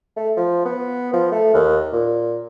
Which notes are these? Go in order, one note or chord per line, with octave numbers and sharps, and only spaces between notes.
A3
F3
B3
F3
A3
D#2
A#2